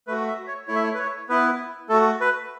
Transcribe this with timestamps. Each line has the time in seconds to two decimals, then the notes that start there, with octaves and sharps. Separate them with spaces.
0.07 A3 F#4 B4
0.28 E5
0.47 C#5
0.68 A3 E4 C#5
0.75 E5
0.84 C#5
0.94 B4
0.98 C#5
1.29 B3 E4 B4
1.89 A3 F#4 A4
2.21 B4